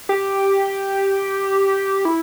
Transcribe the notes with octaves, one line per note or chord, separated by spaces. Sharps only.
G4
E4